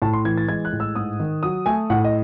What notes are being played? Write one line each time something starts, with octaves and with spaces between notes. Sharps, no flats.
A2 A5
C6
E3 G#6
A6
G#3 G#6
F#6
A2
E6
G#2 D#6
D#3
F#3 D#6
A3 G#5
A2 F#5
D#5